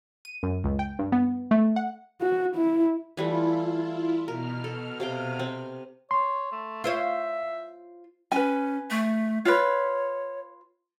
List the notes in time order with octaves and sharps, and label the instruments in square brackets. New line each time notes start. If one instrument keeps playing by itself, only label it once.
[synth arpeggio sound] D#7
F#2
C#2
G5
G2
B3
A3
F#5
[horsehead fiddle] F#4
E4
[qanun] E3 G3 A3 [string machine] E4 F4
[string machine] B2 F6 [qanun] A#4
[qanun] A4
C3 F5 G5
C4
[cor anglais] C#5 [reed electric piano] C6
[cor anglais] A3
[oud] F4 C5 C#5 [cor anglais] E5
[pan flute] C#4 [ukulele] B4 G#5
[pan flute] A3
[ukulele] F4 B4 [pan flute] C#5